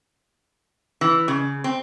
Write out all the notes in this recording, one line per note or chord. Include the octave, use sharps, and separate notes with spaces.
E3
C#3
C4